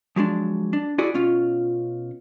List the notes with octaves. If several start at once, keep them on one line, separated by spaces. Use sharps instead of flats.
F3 F#3 G#3 D4
D4
E4 F#4 G#4 D5
B2 C#4 F4